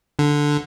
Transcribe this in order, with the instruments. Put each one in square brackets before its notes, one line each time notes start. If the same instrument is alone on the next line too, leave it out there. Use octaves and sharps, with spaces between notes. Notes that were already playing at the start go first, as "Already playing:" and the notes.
[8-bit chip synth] D3